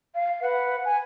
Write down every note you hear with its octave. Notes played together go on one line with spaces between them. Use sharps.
F5
B4 F#5
G#5